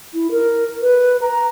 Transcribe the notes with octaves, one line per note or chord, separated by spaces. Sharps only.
E4
A#4
B4
A#5